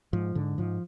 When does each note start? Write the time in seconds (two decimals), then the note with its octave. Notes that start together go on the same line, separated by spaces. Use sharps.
0.13 G#2 F3
0.35 G#2 D3
0.58 G#2 F3